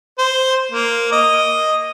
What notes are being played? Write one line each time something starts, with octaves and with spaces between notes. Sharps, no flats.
C5
A#3
D#5